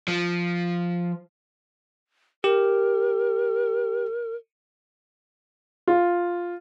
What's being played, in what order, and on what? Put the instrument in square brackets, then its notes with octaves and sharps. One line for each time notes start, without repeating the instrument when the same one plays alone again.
[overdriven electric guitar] F3
[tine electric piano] G4 [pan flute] A#4
[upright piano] F4